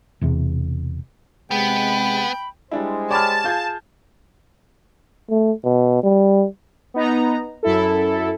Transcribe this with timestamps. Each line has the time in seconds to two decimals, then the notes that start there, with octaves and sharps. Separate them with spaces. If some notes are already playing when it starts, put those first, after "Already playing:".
0.21 E1 E2 C3
1.51 C3 G#3 B3 G5 B5
2.71 G3 G#3 D4 E4 G4 C5
3.11 C#5 D5 G5 A5 B5 D6 F6
3.44 F4 G#4 F5 G6 G#6
5.30 A3
5.64 B2
6.03 G3
6.94 B3 D#4 A#5
7.63 F#2 E4 A4